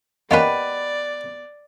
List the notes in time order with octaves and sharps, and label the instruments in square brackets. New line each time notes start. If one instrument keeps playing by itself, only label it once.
[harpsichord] A#3 C#4 A#4 [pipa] B3 G4 B4 [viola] D5 [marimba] D#5